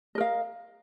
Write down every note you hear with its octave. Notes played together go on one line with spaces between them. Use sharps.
A#4 D#5 F5